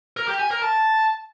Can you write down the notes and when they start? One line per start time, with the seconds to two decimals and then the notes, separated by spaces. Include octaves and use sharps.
0.17 A#4
0.28 G4
0.39 G#5
0.51 A#4
0.62 A5